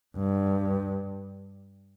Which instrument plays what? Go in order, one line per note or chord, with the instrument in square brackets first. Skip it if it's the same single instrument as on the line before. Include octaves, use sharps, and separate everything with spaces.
[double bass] G2